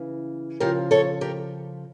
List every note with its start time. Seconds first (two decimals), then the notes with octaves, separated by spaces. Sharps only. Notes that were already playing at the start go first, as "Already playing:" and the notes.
Already playing: C#3 E3
0.60 C#3 F3 G4 A#4
0.91 A4 C#5
1.21 G4 A#4